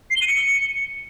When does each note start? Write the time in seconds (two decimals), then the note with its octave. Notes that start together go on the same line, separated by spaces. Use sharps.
0.10 C7
0.16 G7
0.22 D#7
0.27 C#7